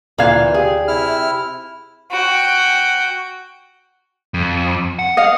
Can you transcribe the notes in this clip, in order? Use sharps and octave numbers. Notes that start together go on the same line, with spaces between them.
D2 A#2 E3 D5 F5 G#6
G4 G#4
C3 E4 F6
F#4 G5
F2
F#5
D#5 F5